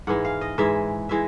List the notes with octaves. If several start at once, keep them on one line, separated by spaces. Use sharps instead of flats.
G#2 E3 G#3 F#5
F5
D#5
G#2 E3 G#3 E5
E3 G#3 E5